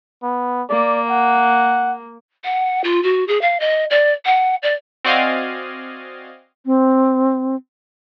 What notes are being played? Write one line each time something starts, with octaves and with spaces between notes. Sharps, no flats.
B3
A#3 D5
F#5
F#5
F4
F#4
G#4
F5
D#5
D5
F#5
D5
C4 F#4 D5 D#5 F5 G#5
C4